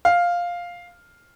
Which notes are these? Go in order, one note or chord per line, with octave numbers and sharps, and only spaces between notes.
F5